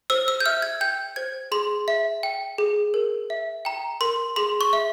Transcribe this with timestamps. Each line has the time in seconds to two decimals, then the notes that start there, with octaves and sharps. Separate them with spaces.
0.10 C5 E6
0.28 E6
0.40 G6
0.46 E5 F6
0.62 G#6
0.81 G5 G6
1.16 C5 G#6
1.52 G#4 C6
1.88 E5
2.23 G5
2.58 G#4
2.94 A#4
3.30 E5
3.65 G5 A#5
4.01 A#4 C6
4.36 G#4 C6
4.61 C#6
4.73 E5